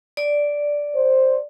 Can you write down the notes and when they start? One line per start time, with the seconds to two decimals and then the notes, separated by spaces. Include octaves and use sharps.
0.17 D5
0.95 C5